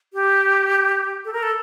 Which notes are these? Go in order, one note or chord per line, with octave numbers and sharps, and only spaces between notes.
G4
A4
A#4
A4